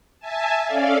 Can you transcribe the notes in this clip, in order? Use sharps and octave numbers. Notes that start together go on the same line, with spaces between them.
E5 G#5 A5
C#4 A4 D5 F5